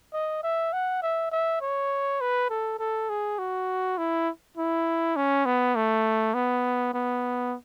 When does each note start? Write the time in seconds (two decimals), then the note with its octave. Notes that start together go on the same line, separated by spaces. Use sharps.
0.13 D#5
0.43 E5
0.73 F#5
1.02 E5
1.32 E5
1.61 C#5
2.21 B4
2.50 A4
2.79 A4
3.09 G#4
3.39 F#4
3.98 E4
4.57 E4
5.16 C#4
5.46 B3
5.76 A3
6.34 B3
6.94 B3